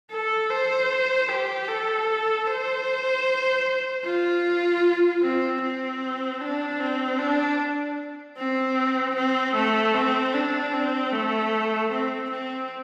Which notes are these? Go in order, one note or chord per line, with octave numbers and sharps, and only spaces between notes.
A4
C5
G4
A4
C5
F4
C4
C4
D4
C4
D4
C4
C4
A3
C4
D4
C4
A3
C4
C4